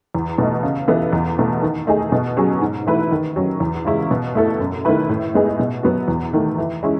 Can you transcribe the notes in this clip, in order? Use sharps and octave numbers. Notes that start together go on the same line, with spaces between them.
E2
B2 A3 D#4
C#3
E3 B3 D#4 A4
E2
B2 A3
D#3
A3 D#4 G#4
B2
F#3 C#4 G#4
G#2
E3 A3 E4 B4
D#3
F#3 C#4
E2
C#3 G#3 C#4 E4
B2
A3 E4 A4
F#2
D#3 A3 E4 B4
A2
G#3 B3 D#4 G#4
B2
F#3 B3 F#4
E2
D#3 A3
E3
G#3 C#4 E4